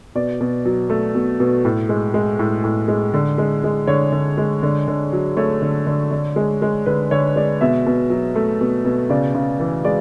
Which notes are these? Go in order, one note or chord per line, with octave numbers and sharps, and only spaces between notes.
B2 D5
B2
F#3
A3
B2
B2
A2
G#3
G#3
A2
A2
G#3
D3
G#3
G#3
D3 C#5
D3
G#3
D3
D3
F#3
A3 C#5
D3
D3
D3
G#3
G#3
D3 B4
D3 C#5
G#3 D5
B2 E5
B2
F#3
A3
B2
B2
C#3 D5
C#3
E3
G#3 D5